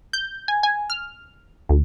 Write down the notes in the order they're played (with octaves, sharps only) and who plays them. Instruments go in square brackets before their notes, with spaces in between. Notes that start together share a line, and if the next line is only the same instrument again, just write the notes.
[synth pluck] G6
G#5
G#5
F6
D2